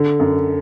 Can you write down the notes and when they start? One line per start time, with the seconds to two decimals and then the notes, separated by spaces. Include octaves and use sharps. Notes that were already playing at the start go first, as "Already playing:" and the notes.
Already playing: D3
0.20 F#2